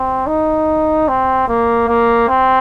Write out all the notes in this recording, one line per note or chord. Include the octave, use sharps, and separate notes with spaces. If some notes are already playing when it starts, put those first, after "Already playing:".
Already playing: C4
D#4
C4
A#3
A#3
C4